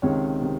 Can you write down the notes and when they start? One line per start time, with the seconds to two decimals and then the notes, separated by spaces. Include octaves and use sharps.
0.02 C#2 C3 D#3 C#5
0.41 C3 D#3